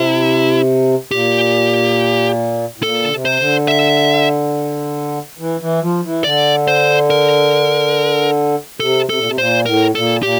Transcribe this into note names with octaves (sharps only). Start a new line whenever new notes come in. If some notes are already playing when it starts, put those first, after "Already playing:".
Already playing: C3 E4
A#2 G4
A2
A#2 A4
D3
C3
C5
D3
E5
E3
E3
F3
E3
D3 D5
C5
A#4
C3 A4
C3 A4
A#2
C3
A#2 C5
A2 A#4
A#2 A4
A#2 G4